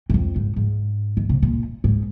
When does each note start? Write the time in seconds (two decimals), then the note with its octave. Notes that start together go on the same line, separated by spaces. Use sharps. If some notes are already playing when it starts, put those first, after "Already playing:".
0.10 G#2
0.14 F2
0.36 G#2
0.56 G#2
1.17 D#3
1.29 C3
1.42 A#2
1.84 G#2